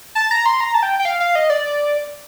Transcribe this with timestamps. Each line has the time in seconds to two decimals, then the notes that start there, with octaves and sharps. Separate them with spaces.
0.15 A5
0.31 A#5
0.46 C6
0.61 A#5
0.74 A5
0.83 G5
0.99 G5
1.05 F5
1.20 F5
1.35 D#5
1.50 D5